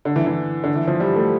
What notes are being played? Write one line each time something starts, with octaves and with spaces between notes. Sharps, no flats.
D3
E3
E3
D3
E3
F3
G3
A3